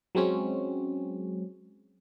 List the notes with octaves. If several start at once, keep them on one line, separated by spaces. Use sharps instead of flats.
F#3 G#3 C4 C#4